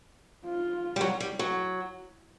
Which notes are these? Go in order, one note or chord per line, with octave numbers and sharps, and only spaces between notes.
F4
G3
F#3
G3
F#3